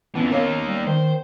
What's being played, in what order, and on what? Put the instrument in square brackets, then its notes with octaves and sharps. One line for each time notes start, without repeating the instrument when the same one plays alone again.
[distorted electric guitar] F2 E3 [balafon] B3 C#4
[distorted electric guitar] A#3 D#4 [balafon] A#4 C#5 F5
[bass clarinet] G3
[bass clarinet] D#3 [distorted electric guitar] C5